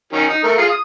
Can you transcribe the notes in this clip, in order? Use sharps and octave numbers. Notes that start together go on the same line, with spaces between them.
D#3 F#3 C#4
D#4
A3 A#4
F4 G#4 F5
D#6